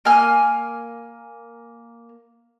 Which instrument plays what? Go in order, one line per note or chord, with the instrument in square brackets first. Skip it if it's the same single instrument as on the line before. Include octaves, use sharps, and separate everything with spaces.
[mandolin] A#3 G#5 F6